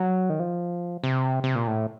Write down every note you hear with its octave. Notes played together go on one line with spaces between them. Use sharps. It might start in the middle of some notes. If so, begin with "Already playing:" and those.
Already playing: F#3
D#3
F3
C3
C3
A#2
A2